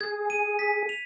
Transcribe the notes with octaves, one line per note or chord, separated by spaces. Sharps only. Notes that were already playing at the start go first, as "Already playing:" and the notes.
G#4 G#6
D#7
B6
F7